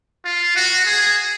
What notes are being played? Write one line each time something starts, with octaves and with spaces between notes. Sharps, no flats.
F4
F#4
G#4